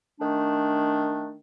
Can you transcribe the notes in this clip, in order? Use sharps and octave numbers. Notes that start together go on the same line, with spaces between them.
D#3 A3 D4